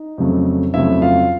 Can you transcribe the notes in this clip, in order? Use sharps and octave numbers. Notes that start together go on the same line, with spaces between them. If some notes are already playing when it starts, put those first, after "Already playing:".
Already playing: D#4
F2 C#3 F#3 A3
F2 C#3 F#3 A3 E4 E5
F4 F5